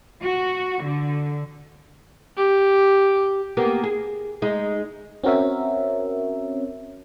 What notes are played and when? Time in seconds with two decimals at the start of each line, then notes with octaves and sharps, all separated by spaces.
0.23 F#4
0.85 D3
2.37 G4
3.57 A#3 B3 G4
3.84 G#4
4.42 G#3 D#4
5.24 C4 C#4 F#4 A#4 C#5 E5